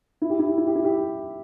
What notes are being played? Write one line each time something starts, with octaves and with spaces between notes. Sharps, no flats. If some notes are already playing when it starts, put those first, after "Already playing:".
E4
G4
E4
G4
E4
G4
E4
G4